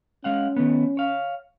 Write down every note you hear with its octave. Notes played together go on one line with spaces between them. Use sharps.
G#3 C#4 F5 F#5
D#3 A3 B3
C#5 F5